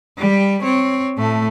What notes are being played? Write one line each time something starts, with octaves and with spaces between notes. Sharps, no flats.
G3 G4
C4 C#5
A2 A3